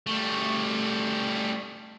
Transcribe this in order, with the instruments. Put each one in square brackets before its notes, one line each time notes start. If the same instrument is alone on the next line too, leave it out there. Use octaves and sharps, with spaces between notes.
[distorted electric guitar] G3 A3